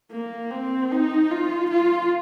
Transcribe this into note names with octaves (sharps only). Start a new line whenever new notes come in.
A#3
C4
D#4
F4
F4